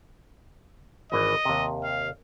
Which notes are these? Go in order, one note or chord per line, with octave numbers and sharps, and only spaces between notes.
G#1 E3 D#5
D#2 C3
F5